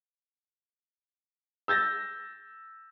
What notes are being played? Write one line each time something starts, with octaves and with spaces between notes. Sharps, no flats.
E6 G6 A6 A#6